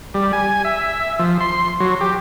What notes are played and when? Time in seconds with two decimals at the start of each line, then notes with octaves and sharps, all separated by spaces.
0.14 G3
0.33 G#5
0.65 E5
1.19 F3
1.40 C6
1.80 F#3
2.01 G4